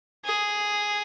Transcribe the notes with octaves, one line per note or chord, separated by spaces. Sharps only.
G#4